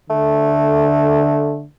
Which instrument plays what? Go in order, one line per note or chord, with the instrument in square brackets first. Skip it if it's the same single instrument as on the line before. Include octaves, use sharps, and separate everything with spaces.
[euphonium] D3 [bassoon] A3